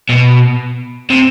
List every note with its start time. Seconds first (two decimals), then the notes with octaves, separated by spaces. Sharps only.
0.09 B2
1.10 C3